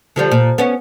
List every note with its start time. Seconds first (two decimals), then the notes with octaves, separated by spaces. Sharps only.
0.16 D3 F3 G3
0.31 A#2
0.58 B3 C#4